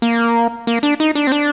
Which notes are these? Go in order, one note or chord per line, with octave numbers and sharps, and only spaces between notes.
A#3
A#3
D4
D#4
D4
C4
D4